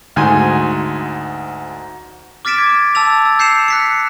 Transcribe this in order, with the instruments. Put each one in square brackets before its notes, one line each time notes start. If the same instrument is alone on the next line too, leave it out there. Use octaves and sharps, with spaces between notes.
[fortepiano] D2 G#2 G#5 C6
[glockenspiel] D6 F6 A6 B6 D7 E7
G#6
A5 E6 A6 F7
E6
G6 C7 C#7 E7 F7
F#6 B6 C#7